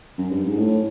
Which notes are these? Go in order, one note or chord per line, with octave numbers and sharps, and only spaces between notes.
F#2
G2
G#2
A2